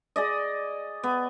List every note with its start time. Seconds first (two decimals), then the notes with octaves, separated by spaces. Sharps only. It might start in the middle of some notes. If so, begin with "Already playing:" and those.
0.16 G#4 D5 D#5
1.03 B3